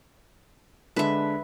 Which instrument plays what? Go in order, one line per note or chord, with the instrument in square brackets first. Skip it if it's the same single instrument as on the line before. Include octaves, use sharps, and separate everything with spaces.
[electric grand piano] D3 G#3 D4 [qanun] B4 E5